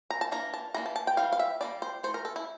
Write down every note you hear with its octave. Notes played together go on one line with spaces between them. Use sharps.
A#5
A5
E3 A#3 D4 A#5
A5
E3 A#3 D4 A#5
A5
A5
G5
E3 G3 C4 F5
F5
E5
G3 A#3 D4 D5
C5
E3 A3 C5
A#4
A4
E4